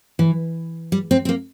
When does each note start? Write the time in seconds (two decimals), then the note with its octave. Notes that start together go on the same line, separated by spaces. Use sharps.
0.19 E3
0.92 G3
1.11 C4
1.25 C4
1.29 A#3